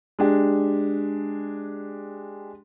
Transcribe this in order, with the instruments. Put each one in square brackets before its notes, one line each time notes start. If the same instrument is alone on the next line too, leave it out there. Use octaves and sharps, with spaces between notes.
[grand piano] G#3 D4 G4